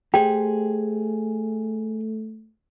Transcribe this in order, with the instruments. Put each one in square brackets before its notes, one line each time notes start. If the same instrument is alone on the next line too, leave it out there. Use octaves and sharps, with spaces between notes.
[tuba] A3 [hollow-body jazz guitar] G4 G#4 C5 [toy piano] G5